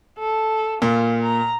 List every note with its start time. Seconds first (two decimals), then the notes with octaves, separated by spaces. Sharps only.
0.19 A4
0.82 A#2 F4
1.22 A#5